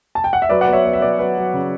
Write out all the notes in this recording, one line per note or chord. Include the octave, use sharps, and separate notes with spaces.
A5
G5
F#5
E5
F#3 B4 D5
D5 F#5
B3
C#5 E5
B3 D5
E5
F#3 B4 D5
F#3 B4
F#3
C#3